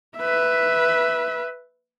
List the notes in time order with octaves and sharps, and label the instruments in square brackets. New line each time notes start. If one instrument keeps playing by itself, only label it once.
[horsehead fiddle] B4 E5